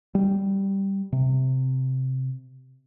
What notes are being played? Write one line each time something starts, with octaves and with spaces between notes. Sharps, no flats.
G3
C3